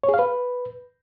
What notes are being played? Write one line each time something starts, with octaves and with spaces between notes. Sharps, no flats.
C#5
G#4
F5
B4